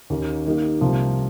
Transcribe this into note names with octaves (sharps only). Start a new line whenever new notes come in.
D#2 D#3 A#3 C#4
D#3 A#3 D#4 G4
C2 C3 F3 A#3